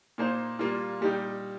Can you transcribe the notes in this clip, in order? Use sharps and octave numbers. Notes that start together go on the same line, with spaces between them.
A#2 A#3 D#4 C5
A#2 G3 A#3 F4
A#2 G3 D#4 G4